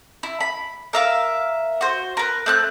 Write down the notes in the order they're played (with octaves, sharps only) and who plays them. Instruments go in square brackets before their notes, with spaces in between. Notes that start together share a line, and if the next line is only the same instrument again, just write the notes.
[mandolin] E4
B5
A#4 E5 F5
F#4 C5
A#4 B4
A3 C4 F#6